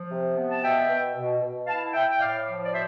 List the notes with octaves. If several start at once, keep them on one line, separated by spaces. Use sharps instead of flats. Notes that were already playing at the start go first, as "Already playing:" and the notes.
Already playing: F3
C3
B3
A5
B2 E5 G5
B2
B2
B2
E4 F5 A5
E4 E5 G5
G5
A2 D5 F5
F3
D5
B2 C5 E5